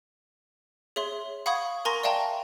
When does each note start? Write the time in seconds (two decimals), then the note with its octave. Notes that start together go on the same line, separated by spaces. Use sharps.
0.96 G#4 C#5 E5 C6
1.46 F5 F#5 B5 C#6 D#6 G#6
1.85 A#4 G#5 A#5 C6 C#6 A#6
2.03 D5 E5 F5 G5 A5 A#5